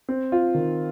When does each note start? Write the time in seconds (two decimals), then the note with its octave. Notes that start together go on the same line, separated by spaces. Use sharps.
0.09 C4
0.32 F4
0.55 D#3